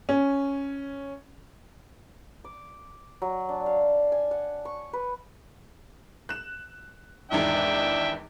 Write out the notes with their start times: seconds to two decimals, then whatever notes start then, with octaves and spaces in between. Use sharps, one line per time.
0.09 C#4
2.44 D6
3.22 F#3
3.49 D4
3.66 F5
4.12 G#5
4.31 F#5
4.65 C#6
4.93 B4
6.29 F#6 E7
7.31 G#1 E2 G#2 D4 E5 G5